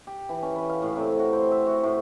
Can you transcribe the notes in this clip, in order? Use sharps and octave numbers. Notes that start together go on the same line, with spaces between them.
G4
E3
C#4
B4
F5
A2
C3
F#4
C5
E5
F#4
A2